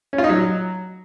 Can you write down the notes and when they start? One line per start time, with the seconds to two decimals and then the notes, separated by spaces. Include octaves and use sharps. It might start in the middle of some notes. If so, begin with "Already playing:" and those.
0.13 C#4
0.18 F4
0.24 D#4
0.29 F#3